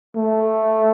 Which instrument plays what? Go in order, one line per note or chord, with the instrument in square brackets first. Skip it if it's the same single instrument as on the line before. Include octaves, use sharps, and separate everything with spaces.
[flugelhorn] A3